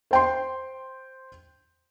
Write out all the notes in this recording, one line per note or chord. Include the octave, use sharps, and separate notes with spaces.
C5 G5 C6